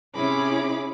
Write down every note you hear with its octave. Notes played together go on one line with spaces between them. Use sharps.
C3 C#4 E4 G#4 B5 D6